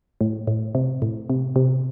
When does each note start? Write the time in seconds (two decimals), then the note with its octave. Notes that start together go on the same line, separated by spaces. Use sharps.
0.21 A2
0.47 A2
0.75 C3
1.02 A2
1.30 C3
1.56 C3